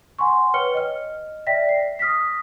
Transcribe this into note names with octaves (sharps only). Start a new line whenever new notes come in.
F#5 G#5 C6 C#6
B4 C#5 G5 F6 C#7 G7
D#5 F6
D5 E5 G5 A#6 B6
C7
D#6 F6 A#6 B6